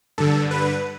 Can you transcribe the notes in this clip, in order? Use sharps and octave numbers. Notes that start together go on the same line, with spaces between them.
G2 D3 A4
B4